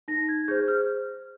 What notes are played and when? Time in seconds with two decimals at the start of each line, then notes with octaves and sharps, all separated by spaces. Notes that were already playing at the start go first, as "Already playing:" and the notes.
0.08 D#4 A#6
0.29 G#6
0.48 G#4 G6
0.51 C5
0.68 F6